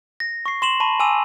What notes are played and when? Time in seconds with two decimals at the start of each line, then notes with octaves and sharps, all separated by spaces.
0.20 A#6
0.46 C#6 C7
0.62 C6 E7 F#7
0.80 A5 B5 C#6 D#7
1.00 G#5 A5 D6 E6 D#7 F7